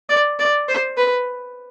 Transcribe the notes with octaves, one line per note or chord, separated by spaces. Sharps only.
D5
D5
C5
B4